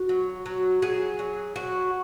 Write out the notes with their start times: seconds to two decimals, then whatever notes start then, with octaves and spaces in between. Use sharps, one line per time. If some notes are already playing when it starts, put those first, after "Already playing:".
Already playing: F#4
0.09 F#3
0.46 F#3
0.82 F#3 G#4
1.19 F#3
1.56 F#3 F#4